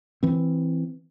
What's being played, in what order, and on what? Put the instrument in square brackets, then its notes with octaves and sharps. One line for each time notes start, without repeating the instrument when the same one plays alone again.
[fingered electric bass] E3 C4